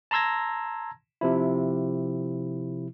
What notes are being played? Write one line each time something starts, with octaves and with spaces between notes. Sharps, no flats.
A5 A#5 C6 E6 G#6 A#6
C3 F3 E4